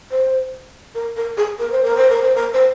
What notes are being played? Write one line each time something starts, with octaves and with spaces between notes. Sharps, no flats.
C5
A#4
A#4
G#4
A#4
C5
A#4
C5
A#4
C5
A#4
C5